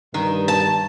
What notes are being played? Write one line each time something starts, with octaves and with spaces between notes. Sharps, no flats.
G2 D#3
A5